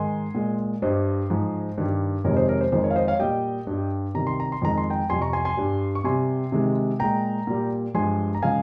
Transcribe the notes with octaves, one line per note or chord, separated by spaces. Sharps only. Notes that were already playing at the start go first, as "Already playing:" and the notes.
Already playing: G#2 D#3 G#3 G#5 C6
A#2 G#3
G2 G3 C5 D#5
G#2 F3 G#3
G2 D#3 G3
F2 C3 D#3 G#3 A#4 C#5
C5 D#5
A#4 C#5
C5
F2 D#3 G#3 C5
A#4 C#5
F5
C5 D#5
C#5 F5
A#2 G3 D#5 G5
G2 G3
C3 D#3 G3 A#5
C6
A#5
C6
F2 D#3 G#3 A#5
C6
G5 A#5
F2 C3 G3 G#5 C6
A#5 C#6
G#5 C6
G#5 C6
G2 G3
C#6
C3 G3 G#5 C6
C3 D#3 G#3
A#2 G#3 G5 A#5
A#2 G3
G2 F3 G#3 G#5 C6
A#5
C#3 F3 G#3 F5 G#5